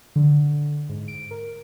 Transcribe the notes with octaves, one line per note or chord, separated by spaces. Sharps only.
D3
G#2
D7
A#4